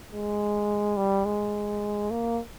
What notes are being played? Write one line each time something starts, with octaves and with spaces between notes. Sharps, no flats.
G#3
G3
G#3
A#3